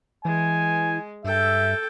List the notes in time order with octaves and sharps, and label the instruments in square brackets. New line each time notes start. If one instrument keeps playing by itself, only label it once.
[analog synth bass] E3 [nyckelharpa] G#3 [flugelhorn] G#5
[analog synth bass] G2 [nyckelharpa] A4 G5 [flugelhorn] E5